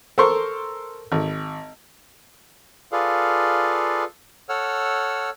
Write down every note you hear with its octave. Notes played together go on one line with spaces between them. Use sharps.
A4 A#4 C5 C6 C#6
G#1
F4 G#4 A4 B4 D5 F5
A4 C#5 F#5 E6 F6